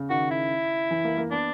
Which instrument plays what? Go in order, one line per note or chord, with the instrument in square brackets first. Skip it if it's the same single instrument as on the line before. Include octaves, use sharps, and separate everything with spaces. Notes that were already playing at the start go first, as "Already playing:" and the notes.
Already playing: [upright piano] C#3
[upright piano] D#3 [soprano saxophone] F#4
[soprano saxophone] E4
[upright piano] E3
A#3
A#3
[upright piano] B3 [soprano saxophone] D4